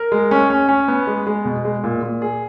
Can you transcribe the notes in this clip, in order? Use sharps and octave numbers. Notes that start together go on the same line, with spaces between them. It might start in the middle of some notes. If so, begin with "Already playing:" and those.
Already playing: A#4
G#3
C#4
C#4
C#4
B3
G#3
G#3
B2
G#3
A#2
A#2
G#4